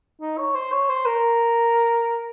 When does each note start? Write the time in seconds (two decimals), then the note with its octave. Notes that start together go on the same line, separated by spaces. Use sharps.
0.21 D#4
0.38 C#5
0.55 C5
0.72 C#5
0.89 C5
1.06 A#4